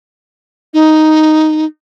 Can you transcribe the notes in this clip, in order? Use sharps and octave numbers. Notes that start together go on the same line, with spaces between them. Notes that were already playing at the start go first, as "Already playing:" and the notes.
D#4